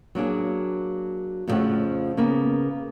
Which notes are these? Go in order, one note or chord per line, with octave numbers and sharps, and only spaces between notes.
F#3 A#3 D4 G#4
F2 A#2 C#3 F3 A3 F#5
C#3 A#3 B3